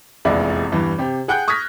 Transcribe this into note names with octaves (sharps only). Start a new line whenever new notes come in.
F1 A#1 E2 G#3 E4 D5
E2 G2 E3
C3 G4
G#4 F#5 G5 F#6 G6
C#6 D#6 F6 G#6 A#6 B6